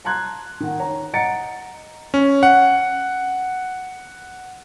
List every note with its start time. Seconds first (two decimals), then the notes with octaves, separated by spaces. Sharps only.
0.05 A5 A#5 C6 F#6 G#6
0.60 D#3 F#5
0.79 C#5 A#5
1.13 D#5 F#5 A#5 A6 C#7 D7
2.14 C#4
2.43 F#5